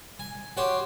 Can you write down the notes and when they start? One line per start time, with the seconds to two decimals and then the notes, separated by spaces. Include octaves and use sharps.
0.20 G#5
0.57 F#4 G4 C#5 C6